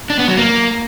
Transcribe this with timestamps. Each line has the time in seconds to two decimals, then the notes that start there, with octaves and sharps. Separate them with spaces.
0.10 D4
0.19 B3
0.28 F#3
0.37 A#3